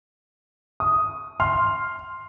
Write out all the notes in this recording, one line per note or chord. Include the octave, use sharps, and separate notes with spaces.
D#6
C6 F6